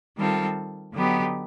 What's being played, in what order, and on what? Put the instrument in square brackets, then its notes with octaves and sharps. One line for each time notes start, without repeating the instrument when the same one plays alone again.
[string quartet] D#3 G3 C4 F4 A4
D3 F#3 B3 D#4 G4